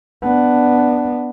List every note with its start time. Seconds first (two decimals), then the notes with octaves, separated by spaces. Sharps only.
0.23 B3 D4